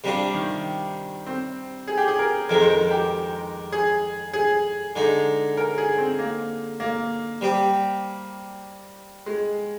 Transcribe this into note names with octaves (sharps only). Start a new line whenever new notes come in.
C3 G3 D4 F4
D#3
C4
G#4
G4
G#4
A#4
F2 D#3 G#3 A#4
C5
A#4
G4
G#4
G#4
D3 G#3 D#4
A#4
G#4
C4
A#3
A#3
G3 C4 G4
G#3